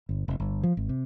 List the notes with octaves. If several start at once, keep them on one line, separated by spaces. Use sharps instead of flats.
G1
F1
G1
F3
G#1
C3